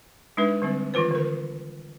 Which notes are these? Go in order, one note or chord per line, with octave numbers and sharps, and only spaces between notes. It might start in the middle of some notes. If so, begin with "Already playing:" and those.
G#3 D4 D#4 B4 E5
D3 G3 C4
D#3 E3 F4 B4 C5
D3 A#4